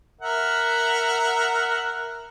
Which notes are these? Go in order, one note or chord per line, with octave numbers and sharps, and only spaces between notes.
A#4 E5 F#5